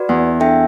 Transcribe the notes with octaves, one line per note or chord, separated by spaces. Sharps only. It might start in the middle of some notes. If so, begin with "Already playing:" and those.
Already playing: F#4 B4 D5
E2
D4 A4 E5 G5